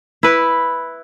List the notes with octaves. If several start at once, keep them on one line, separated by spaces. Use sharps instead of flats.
E4 B4